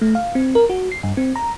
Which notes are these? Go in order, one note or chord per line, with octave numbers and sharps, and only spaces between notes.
A3
F5
C4
A#4
F#4
C7
G2
C4
A#5